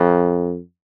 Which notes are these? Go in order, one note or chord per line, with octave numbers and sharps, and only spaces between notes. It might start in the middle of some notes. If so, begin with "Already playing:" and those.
Already playing: F2